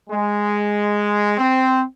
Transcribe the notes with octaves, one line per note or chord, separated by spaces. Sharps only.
G#3
C4